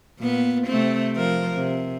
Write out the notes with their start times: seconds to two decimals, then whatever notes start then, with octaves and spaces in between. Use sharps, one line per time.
0.19 A#2 B3
0.67 C3 A3 C4
1.16 F3 A#4
1.55 C3